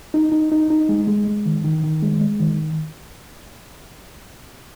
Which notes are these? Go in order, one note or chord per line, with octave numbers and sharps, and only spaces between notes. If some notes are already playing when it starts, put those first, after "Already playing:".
D#4
D#4
D#4
D#4
G#3
G#3
G#3
D#3
D#3
D#3
G#3
G#3
D#3